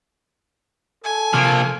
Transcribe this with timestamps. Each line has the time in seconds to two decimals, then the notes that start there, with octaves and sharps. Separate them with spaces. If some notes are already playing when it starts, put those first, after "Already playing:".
1.04 A4 G#5
1.33 C3 F3 A#3 F6